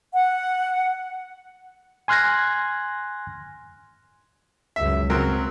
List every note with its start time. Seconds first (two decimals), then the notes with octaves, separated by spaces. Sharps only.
0.14 F#5
2.08 G#5 C6 F6 F#6 G#6 A#6
4.76 C#2 F#2 E5
5.10 C#3 F#3 C4 A#4